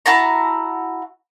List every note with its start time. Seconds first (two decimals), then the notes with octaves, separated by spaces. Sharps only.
0.06 E4 F#4 A5 A#5